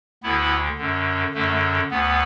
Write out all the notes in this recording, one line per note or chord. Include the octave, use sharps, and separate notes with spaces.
D2 D3 B3 E4
F#2 D3
F#2 D3 A3
D2 B3